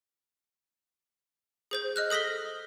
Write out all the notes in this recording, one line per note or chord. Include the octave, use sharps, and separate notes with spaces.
G#4 C5 G6
D#5 F6 F#6
A4 D#6 A#6 B6 G7